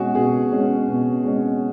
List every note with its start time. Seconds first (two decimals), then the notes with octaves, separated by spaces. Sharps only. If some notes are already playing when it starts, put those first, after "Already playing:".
Already playing: B2 G#3 C#4 F#4 G#4
0.15 B2 G#4
0.51 G#3 C#4
0.88 B2
1.24 G#3 C#4